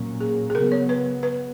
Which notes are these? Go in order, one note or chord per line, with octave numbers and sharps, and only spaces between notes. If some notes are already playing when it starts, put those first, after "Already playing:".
Already playing: A#2 F#3 A#3 C#4
G#4
G#4
C#3 F#3 B3 A#4
C#5
B4
B3 B4